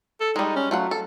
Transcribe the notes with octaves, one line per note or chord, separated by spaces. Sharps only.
A4
G3 G#3 D#4
C#4
F#3 A3 F4 F#5
A4